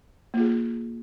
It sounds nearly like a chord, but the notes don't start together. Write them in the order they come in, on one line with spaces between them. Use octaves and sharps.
A#3 F4 G#4